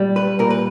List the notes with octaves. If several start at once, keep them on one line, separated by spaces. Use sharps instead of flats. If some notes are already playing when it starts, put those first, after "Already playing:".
Already playing: A#2 G3
B4
A#2 A#4
B4